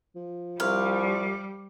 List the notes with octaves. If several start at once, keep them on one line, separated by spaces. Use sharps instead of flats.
F3
C2 G3 F5